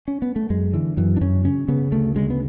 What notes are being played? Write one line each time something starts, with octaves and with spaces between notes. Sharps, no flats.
C#4
B3
A3
F#2 G#3
D3 E3
F#2 E3
D4
F#2 C#4
C#3 C#4
C#3 B3
D2 A3
C#3 G#3
B3